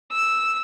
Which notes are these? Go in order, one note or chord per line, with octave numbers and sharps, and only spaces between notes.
E6